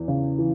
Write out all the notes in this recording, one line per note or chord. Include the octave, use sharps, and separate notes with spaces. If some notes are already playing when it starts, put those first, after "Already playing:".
Already playing: E2 E3
C#3
E3